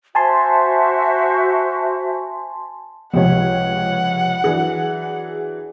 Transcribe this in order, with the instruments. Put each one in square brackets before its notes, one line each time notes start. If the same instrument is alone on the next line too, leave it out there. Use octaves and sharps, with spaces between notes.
[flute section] F#4 C5 E5 [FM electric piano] G#5 A5 C6
[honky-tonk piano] C#2 G4 C#5 [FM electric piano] C3 F3 [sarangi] F#5
[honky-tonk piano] E3 F#3 D4 [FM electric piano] G#4